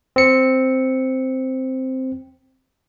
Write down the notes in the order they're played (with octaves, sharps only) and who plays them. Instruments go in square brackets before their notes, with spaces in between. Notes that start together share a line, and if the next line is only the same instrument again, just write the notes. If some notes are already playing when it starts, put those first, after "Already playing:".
[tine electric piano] C4 C#7